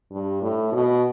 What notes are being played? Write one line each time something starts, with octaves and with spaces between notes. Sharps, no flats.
G2
A2
B2